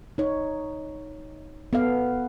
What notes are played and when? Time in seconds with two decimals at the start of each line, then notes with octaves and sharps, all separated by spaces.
0.18 D#4 C#5
1.73 B3 A4 F5